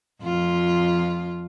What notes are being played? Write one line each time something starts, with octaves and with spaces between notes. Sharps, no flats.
F2 F4